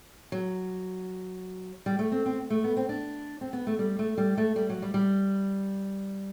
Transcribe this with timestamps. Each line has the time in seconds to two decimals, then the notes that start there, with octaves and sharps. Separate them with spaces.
0.32 F#3
1.86 G3
1.99 A3
2.12 C4
2.26 C4
2.50 A3
2.64 B3
2.77 C4
2.89 D4
3.41 C4
3.53 B3
3.67 A3
3.79 G3
3.99 A3
4.18 G3
4.37 A3
4.56 G3
4.69 F#3
4.82 G3
4.94 G3